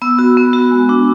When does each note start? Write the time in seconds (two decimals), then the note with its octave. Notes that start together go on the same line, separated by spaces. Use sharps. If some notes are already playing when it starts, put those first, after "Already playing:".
0.02 B3 E6
0.19 F#4
0.37 B3
0.53 F#4
0.71 G#3
0.89 D4